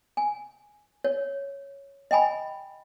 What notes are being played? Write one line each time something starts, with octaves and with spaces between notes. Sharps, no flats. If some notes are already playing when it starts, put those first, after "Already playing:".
G#5
C#5
D#5 G5 G#5 B5